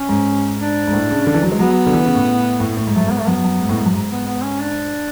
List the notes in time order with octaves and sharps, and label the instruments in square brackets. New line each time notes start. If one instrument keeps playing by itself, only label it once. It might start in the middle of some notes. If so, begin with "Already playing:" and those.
Already playing: [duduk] C#4
[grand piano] G#2
[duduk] D4
[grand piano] G#2
A2
C#3
D3
E3
F#3
G#3
[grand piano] F#3 [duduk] B3
[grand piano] D3
E3
C#3
A2
A2
A2
G#2
[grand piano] F#2 [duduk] A3
[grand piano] G#2 [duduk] B3
[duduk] A3
[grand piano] F#2 [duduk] B3
[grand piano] F#2
G#2
A2
G#2
F#2
G#2
[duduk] B3
B3
C#4
D4